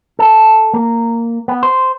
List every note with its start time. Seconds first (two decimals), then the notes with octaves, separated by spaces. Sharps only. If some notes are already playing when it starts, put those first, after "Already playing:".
0.19 A4
0.74 A#3
1.48 B3
1.63 C5